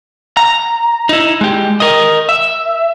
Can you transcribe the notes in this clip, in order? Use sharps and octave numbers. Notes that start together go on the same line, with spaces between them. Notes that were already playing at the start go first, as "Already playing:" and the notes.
A#5
D#4 E4
G#3 G4
A#4 D#5
E5